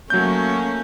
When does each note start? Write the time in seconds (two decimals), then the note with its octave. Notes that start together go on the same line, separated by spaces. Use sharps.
0.10 F#3 A3 A#3 C#4 G6